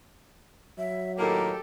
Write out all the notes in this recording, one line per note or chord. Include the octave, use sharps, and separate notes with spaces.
F#3 E5
A2 D#3 A#3 G4 A4 A#5